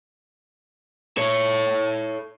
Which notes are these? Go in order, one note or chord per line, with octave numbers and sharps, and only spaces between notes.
A4 C#5